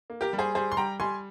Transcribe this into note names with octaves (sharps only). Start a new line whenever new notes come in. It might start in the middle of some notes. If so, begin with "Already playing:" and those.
A#3
G4 A#4
G3
G#4 C5
G3 G#4 C5
C6
G3 G5 A#5
G3 G#5 C6